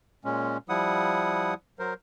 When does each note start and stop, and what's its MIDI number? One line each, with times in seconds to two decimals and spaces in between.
0.25 0.57 46
0.25 0.57 56
0.25 0.57 61
0.69 1.54 53
0.69 1.54 55
0.69 1.54 64
0.69 1.54 78
0.69 1.54 87
1.79 1.94 54
1.79 1.94 70
1.79 1.94 72